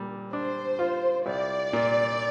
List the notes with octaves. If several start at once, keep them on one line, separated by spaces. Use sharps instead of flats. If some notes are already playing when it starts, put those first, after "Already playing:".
Already playing: A#2 G3
D4 C5
F4
C2 D5
A#2